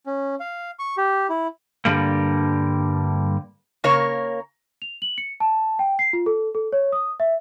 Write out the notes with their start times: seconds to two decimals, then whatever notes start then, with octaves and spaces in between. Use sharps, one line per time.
0.06 C#4
0.40 F5
0.79 C#6
0.97 G4
1.29 E4
1.85 G2 D3 G3 A#3
3.84 C#3 A#3 A#4 C#5
4.82 F7
5.02 F#7
5.18 C#7
5.40 A5
5.79 G5
5.99 C7
6.13 F4
6.26 A4
6.55 A4
6.72 C#5
6.92 D#6
7.20 E5